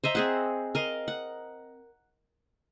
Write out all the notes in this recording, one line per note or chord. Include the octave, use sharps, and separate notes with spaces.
C5 D#5 E5 A#5
C4 G#4 F#5
A#4 D#5 F5
F#5